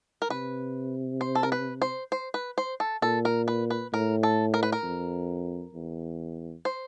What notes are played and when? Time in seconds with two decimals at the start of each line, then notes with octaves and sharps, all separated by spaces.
0.22 A#4
0.30 C3 B4
1.21 C5
1.35 A4
1.43 A#4
1.52 B4
1.82 C5
2.12 C5
2.34 B4
2.58 C5
2.80 A4
3.02 A#2 A4
3.25 A#4
3.48 B4
3.70 B4
3.93 A2 A#4
4.23 A4
4.54 A#4
4.63 B4
4.72 A#4
4.83 F2
5.74 E2
6.65 C5